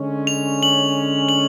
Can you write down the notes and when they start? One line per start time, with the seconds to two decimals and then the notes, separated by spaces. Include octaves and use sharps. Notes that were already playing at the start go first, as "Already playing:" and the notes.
Already playing: D3 G#3 C#4
0.27 F7
0.63 F#7
1.29 F#7